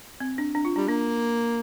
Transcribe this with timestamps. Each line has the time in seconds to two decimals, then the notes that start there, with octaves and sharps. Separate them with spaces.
0.20 C4
0.38 D4
0.55 D4
0.65 F4
0.76 G3 D4
0.88 A#3 D4